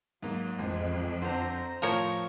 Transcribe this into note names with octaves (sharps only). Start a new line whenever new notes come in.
G#2 F#3 A#3
A1 F2 G#3
D3 C4 C5 A#5
A2 F3 A#4 C#5 C#7